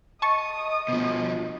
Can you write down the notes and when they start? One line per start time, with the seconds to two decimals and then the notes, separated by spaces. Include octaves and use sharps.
0.22 D#5 A5 C#6 D#6
0.88 B2 F3